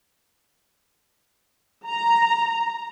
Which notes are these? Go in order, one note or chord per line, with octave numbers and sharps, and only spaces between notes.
A#5